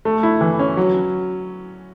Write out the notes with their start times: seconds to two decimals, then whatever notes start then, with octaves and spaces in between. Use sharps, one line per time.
0.05 A3
0.23 E4
0.41 E3
0.59 C#4
0.77 F#3